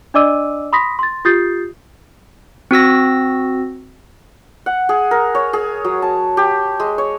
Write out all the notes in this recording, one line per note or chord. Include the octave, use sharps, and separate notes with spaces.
D4 D5 D#5 D6 E6 D#7
B5 C6 D#6 A#6 B6
C6 A6
F4 G4 D#6 G6 A6 C7
C4 F#4 E6 A#6
F#5
G#4
A#4
C#5
G#4
F#3
A5
G4
G#3
C#5